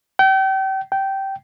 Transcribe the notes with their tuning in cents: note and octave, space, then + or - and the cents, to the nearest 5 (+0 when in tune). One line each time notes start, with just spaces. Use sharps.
G5 -35
G5 -15